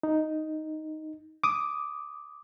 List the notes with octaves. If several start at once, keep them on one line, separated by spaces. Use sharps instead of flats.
D#4
D6 D#6